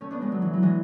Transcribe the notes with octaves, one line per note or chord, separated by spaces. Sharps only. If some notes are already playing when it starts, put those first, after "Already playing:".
A3 C#4
B3 D4
G#3 B3
F#3
E3
F#3
E3 G#3